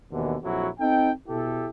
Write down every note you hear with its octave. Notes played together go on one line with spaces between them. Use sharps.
D#2 B2 D3 E3
A#1 F2 F#3 E4 F#4
C4 D#4 A4 G5
B2 E4 G4 A4